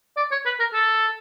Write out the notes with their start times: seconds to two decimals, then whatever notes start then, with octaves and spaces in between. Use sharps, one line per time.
0.17 D5
0.31 C#5
0.45 B4
0.60 A#4
0.73 A4